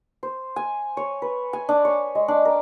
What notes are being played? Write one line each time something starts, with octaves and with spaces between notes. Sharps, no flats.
C5
G#5
C#5
B4
G#5
D4
C#5
G#3
D4
A#4